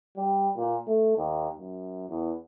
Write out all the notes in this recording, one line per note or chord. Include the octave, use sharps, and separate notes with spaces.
G3
A#2
A3
D#2
F#2
E2